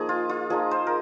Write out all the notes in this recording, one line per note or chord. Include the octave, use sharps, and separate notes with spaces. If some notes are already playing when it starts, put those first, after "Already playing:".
Already playing: F3 A#3 D#4 G#4
F4
F4
F3 A#3 D#4 G#4
C5
A#4